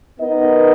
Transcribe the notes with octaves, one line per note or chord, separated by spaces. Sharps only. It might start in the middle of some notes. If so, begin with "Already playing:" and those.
B3 D#4 A#4 D#5